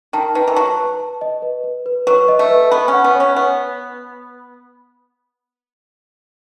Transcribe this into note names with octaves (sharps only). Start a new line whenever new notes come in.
D#3 A5
D#3 B4
E3
F#3 A5
B4
A5
D#5
B4
B4
B4
F#3 B4
D#5
A3
B4
B3 B5
C#4
F#5
B3
C#4 C#5
B3 F#5